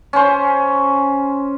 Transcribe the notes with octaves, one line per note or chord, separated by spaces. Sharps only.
C#4 C5